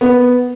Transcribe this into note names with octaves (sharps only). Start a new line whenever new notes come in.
B3